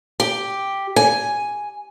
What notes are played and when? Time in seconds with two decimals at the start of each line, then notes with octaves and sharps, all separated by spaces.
0.20 G4
0.96 G#5